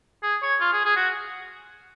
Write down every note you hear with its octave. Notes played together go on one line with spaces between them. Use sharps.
G#4
C#5
F4
G#4
G#4
F#4